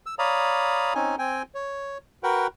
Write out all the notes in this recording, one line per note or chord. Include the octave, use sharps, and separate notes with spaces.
E6
C#5 D5 F5 A#5 B5 D#6
C4 C#4 D#4 G#5
C4 G5 G#5
C#5
F#4 A#4 B4 F#5 G5